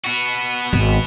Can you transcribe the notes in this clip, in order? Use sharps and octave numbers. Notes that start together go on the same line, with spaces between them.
B3 F#4
G#1